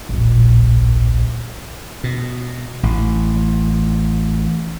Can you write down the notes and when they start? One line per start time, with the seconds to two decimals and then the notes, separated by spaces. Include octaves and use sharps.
0.09 D1 A#1
2.04 B2
2.83 A1